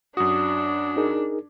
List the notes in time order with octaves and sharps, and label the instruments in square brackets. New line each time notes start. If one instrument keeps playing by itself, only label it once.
[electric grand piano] F#2 F#4 [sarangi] D4 [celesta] D#6
[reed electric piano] D#4 G#4 A#4